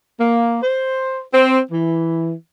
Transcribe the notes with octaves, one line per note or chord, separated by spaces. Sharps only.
A#3
C5
C4
E3